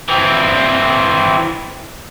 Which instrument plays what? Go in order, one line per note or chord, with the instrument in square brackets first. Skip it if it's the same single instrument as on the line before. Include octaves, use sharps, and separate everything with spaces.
[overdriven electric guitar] E3 C4